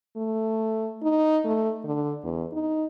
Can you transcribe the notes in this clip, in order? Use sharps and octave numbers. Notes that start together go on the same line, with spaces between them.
A3
D#4
A3
D3
E2
D#4